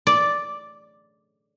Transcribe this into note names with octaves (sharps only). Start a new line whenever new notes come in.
D5